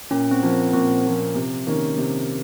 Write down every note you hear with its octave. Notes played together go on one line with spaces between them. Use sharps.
A#2 C#4
C4
F3 A#3 C#4
C4
A#2 C4
F3 A#3 C#4
C3
D#3 A#3 C#4
C3